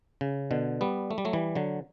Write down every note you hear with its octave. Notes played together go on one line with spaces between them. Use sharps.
C#3
B2 D3
G3 B3
A3
G3
F#3 A3
E3 G3
D3 F#3